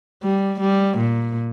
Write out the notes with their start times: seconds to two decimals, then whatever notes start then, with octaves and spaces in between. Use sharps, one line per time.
0.23 G3
0.60 G3
0.98 A#2